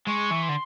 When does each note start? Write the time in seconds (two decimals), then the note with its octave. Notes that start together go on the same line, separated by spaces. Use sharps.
0.07 G#3 C#6
0.31 E3
0.43 C6
0.49 D3